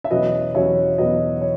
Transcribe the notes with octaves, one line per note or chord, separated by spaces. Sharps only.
E5
E2 B2 F#3 C#4 B4 D#5
E2 B2 F#3 C#4 C#5 E5
E2 B2 F#3 C#4 B4 D#5
C#5